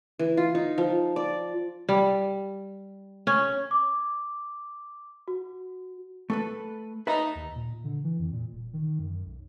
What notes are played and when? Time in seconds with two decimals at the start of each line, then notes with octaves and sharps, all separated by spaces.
0.19 E3
0.37 F4
0.55 D#4
0.78 F3
1.16 D5
1.89 G3
3.27 C#4
3.71 D6
5.28 F#4
6.30 A3 A4 B4
7.07 D#4 B4 E5 A5
7.35 D#2
7.55 A#2
7.84 D3
8.04 E3
8.19 F2
8.33 A#2
8.52 D#1
8.73 D#3
8.99 F#2
9.25 B1